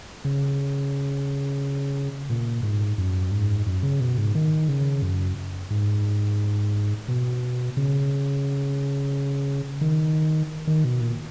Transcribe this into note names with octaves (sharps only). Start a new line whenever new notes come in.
C#3
A#2
G#2
F#2
G#2
F#2
C#3
B2
G#2
D#3
C#3
F#2
G#2
B2
C#3
D#3
D#3
B2
A#2